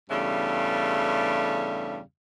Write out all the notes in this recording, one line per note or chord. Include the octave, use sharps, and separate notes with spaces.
E2 G2 C#3 G3 A3